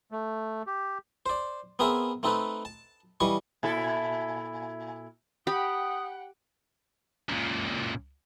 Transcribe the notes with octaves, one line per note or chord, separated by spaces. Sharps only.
A3
G4
C5 D5
B3 C4 G#4 A#4 E5
A3 C4 D#4 A4 B4
A5
E3 G3 D#5 C#6
A#2 E4 A4
G4 F#5 G5 B5 D#6
C#2 A#2